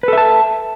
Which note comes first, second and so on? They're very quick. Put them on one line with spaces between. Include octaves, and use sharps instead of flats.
B4 A4 E5 A5